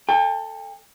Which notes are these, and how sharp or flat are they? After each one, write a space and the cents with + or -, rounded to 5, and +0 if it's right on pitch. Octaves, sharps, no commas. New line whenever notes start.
A4 +10 G5 +40